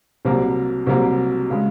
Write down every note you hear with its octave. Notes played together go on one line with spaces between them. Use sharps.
C2 C3 F#3 A#3
C2 C3 F#3 A#3
C#3 G#3